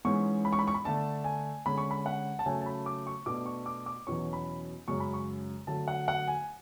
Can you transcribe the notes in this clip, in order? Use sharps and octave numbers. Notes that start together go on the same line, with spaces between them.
G#2 E3 G#3 C#4 C#6
B5
C#6
B5
C#6
B5
D3 A3 D4 A5
G#5
D3 G#3 C#4 B5
C#6
B5
F#5
A5
C#3 F#3 A3 C#4 G#5
A5
B5
D6
C#6
B2 A3 D4 D6
C#6
D6
D6
E2 B2 F#3 C#4 C#6
B5
F#2 C#3 G#3 C#6
B5
C#6
D3 F#3 A3 A5
F#5
F#5
G#5